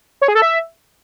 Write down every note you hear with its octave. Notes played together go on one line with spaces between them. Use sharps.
C#5
G#4
A4
E5